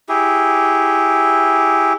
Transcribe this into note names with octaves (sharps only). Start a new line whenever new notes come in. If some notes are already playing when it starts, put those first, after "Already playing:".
E4 G4 G#4